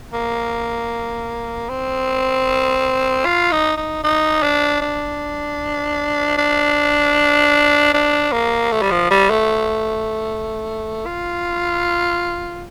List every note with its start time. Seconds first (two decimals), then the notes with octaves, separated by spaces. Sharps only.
0.13 A#3
1.69 C4
3.25 F4
3.52 D#4
3.77 D#4
4.03 D#4
4.43 D4
4.81 D4
6.38 D4
7.94 D4
8.32 A#3
8.72 A3
8.82 G3
8.91 F3
9.10 G3
9.30 A3
11.06 F4